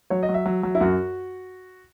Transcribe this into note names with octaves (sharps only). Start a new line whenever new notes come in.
F#3 C#5
D#5
F#3
E5
F#3
F#3
E4
F#2 F#4